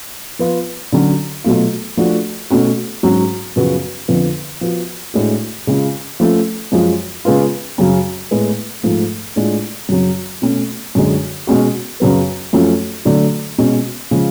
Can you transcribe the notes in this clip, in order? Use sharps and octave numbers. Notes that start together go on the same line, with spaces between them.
F3 B3 F4
D3 F#3 C#4 F#4
B2 F#3 A3 F4
F3 A3 D4 F#4
B2 A3 C#4 F#4
G#2 F#3 C#4 F#4
F#2 C#3 F3 B3 F#4
F2 D3 F3 B3
F3 B3 F#4
A2 G#3 D4 F#4
C#3 G#3 C#4 F4
F3 A3 C#4
F#2 F3 G#3
C#3 G#3 B3 F4
F#2 C#3 F#3 C#4
A2 G#3 B3
G#2 F3 A3 F4
A2 G#3 D4 F4
F#2 C#3 F#3 C#4
B2 A3 C#4
F#2 D3 G#3
B2 G#3 C#4 F#4
F#2 C#3 F#3 B3
F#2 F3 A3 C#4 F#4
D3 F#3 A3 D4
B2 G#3 C#4
C#3 F3 G#3